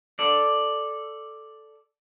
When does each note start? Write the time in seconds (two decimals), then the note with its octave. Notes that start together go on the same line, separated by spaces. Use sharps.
0.19 A4 D5